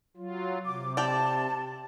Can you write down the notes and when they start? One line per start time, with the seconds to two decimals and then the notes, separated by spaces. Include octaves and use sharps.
0.17 F#3 F4
0.65 C3 D6
0.97 G4 D5 A5